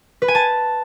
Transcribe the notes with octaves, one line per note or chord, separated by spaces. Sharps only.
B4
G#5
A5